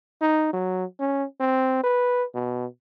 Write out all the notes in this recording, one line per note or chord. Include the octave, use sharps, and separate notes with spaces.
D#4
F#3
C#4
C4
B4
B2